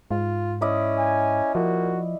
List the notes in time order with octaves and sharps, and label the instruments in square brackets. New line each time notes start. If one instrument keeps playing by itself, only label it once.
[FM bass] G#2 [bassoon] F4
[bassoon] C#4 [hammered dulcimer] E4 D5 D#5
[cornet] G#5
[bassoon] A#2 [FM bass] F3 [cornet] F#4